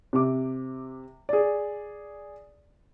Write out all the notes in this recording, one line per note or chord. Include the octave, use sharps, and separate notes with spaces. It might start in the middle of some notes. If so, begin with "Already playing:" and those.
C3 D6
G#4 D5